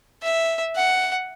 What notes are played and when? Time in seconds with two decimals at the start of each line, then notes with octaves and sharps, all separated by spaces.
0.22 E5
0.75 F#5